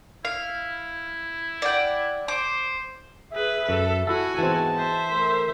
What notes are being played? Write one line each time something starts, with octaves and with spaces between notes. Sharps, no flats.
E4 F5
D5 F#5 G5
C5 D6
G#4 B4 E5
F#2 A4
E4 F#4 A4 G#5
G#2 E3 B3 C4 G#4 A5
C5 E5
A3 A4 A#4 C6